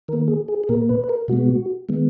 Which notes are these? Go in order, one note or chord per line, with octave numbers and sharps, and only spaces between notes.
D#3 A#3 A#4
G#4
G#4
G#4
A#2 A#3 A#4
B4
B4
A#4
B2 G#3 B3 F#4
D#3 G#3 B3